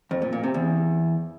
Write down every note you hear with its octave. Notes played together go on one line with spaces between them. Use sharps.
F2
A#2
A#2
C3
E2